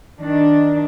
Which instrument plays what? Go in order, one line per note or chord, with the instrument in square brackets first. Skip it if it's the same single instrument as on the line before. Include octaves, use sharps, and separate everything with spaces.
[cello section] D#3 D4